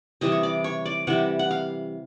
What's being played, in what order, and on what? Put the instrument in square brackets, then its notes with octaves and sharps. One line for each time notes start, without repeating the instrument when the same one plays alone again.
[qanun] C3 E3 G3 D#5
C#5
D5
C#5
D5
C3 E3 G3 F#5
F#5
F5